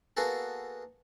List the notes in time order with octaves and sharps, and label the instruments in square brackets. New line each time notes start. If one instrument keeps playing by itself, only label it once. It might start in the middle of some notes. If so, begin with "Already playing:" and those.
[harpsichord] A#3 B3 F#4 G#4 A4